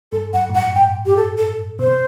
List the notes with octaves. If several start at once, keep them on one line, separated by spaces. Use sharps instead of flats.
G2 A4
F#2 F#5
A2
G2 F#5
G2 G5
G4
A4
A4
B2 C5
C3